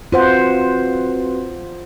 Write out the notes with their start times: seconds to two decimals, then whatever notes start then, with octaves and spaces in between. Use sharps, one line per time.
0.12 C4 F4 F#4 B4 C5 F#5